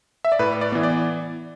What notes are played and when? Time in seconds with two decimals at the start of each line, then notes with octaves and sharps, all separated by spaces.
0.25 E5
0.32 D5
0.39 A2 B4
0.61 D5
0.72 E3 B3
0.83 D5